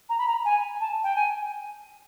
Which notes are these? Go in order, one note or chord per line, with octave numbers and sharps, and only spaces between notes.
A#5
B5
A#5
G#5
A5
G5
G#5